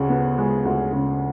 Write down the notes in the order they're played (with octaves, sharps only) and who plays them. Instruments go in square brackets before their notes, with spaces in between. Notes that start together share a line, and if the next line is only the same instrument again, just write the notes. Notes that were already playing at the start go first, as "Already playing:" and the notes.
Already playing: [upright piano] D2 C#3
B3
G#3
D2
C#3